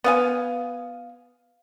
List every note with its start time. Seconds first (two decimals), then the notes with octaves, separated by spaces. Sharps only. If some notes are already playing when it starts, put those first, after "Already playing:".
0.04 B3 F5 G#5